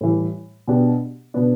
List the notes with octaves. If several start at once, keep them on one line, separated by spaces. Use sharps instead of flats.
A2 E3 G3
B2 B3 D4 G4
B2 B3 D4